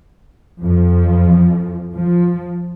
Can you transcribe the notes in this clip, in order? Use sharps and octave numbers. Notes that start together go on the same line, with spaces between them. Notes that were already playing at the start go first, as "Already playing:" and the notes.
F2 F3
F3